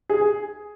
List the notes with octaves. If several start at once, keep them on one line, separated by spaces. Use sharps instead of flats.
G#4